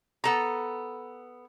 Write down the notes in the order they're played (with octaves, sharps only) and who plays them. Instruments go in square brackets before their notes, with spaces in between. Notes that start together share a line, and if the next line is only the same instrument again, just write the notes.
[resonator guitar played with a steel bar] B3 A4 A#5